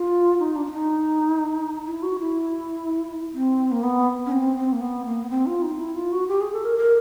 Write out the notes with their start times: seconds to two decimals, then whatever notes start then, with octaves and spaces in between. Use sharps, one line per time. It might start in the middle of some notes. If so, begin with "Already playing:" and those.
Already playing: F4
0.40 D#4
0.56 D4
0.66 D4
0.72 D#4
1.87 E4
2.03 F#4
2.20 E4
3.34 C4
3.71 A#3
3.83 B3
4.26 C#4
4.32 C4
4.56 C4
4.72 A#3
4.81 B3
5.05 A#3
5.23 B3
5.30 C4
5.46 F4
5.63 D#4
5.79 E4
5.96 F4
6.12 F#4
6.28 G4
6.41 G#4
6.53 A4
6.65 A#4
6.77 A#4